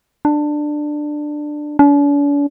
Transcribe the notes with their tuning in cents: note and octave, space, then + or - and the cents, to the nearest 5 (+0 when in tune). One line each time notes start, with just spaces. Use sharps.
D4 +15
D4 -45